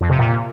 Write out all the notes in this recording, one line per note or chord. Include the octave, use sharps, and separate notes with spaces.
F2
C3
A#2